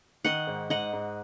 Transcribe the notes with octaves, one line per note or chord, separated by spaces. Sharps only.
D#3 D#5 F#5
G#2
G#2 D#5 F#5
G#2